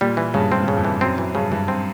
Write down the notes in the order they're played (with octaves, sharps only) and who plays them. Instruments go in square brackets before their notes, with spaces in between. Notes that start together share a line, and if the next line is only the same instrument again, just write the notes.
[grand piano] A#2 [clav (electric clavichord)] G3
[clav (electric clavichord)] E3
[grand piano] G2 [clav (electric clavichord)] C#3
[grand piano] G2 [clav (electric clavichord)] C4
[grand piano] G2
[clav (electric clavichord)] C#3
[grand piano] F2
[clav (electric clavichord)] E3
[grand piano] F#2 [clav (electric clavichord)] C4
[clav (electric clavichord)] E3
[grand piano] G2 [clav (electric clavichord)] C#3
[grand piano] G2 [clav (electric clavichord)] E3
[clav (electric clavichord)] C4